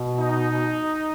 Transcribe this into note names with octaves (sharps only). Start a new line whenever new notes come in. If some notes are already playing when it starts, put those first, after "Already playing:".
Already playing: B2
D#4